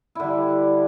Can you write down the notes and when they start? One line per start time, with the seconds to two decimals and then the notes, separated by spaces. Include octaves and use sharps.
0.15 E4
0.20 D3
0.24 G3